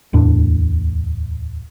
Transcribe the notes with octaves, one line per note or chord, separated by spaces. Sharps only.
D1 E2 A2 D4